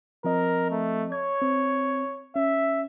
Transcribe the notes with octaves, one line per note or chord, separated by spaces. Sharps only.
F3 C4 A#4 D#5
A3
C#5 G#6
C4
C#4 E5